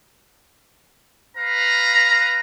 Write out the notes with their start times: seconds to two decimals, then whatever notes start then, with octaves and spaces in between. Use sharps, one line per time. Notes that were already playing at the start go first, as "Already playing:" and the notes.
1.37 B4 F5 A#5